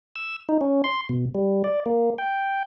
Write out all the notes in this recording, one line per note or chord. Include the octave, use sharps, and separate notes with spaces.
E6
D#4
C#4
C6
B2
G3
D5
A#3
G5